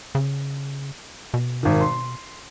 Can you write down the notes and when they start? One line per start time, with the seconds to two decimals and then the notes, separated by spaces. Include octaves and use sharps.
0.15 C#3
1.34 B2
1.63 G#1 D#3
1.81 C6